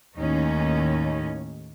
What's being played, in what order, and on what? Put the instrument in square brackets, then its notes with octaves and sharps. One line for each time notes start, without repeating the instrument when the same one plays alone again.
[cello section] D#2 A2 C#4 D#4